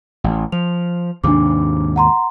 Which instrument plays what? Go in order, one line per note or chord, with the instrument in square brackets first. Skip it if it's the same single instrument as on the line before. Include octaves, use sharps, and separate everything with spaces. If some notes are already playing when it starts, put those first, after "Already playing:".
[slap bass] A1
[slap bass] F3 [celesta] F7
[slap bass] D#2 G#2 C3 [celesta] D4 D6
[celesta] F#5 A#5 C6